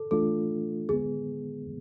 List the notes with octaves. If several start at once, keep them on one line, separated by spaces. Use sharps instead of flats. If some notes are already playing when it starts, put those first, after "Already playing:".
Already playing: A4
E3 A3 D4 F4 A4
D3 G#3 B3 G#4